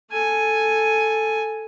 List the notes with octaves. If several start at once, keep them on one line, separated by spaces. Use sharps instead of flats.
A4 G#5